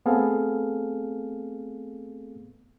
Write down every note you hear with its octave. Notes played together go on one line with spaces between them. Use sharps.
A3 B3 C4 G#4 A4 F5